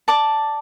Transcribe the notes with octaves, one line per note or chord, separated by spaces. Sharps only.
D5 A5 D6